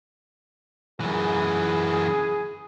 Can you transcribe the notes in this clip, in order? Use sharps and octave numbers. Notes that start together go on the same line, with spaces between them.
F#2 E3 G#4